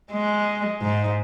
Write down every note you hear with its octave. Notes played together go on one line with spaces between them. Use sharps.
G#3
G#2